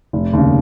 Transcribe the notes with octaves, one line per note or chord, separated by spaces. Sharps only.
F1
D#2 C#3